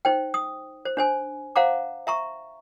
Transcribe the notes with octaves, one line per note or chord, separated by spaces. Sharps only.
D#4 C5 G5
D#6
C5
D4 C5 G#5
C5 F5 F#5 A#5 D6
E5 A#5 C#6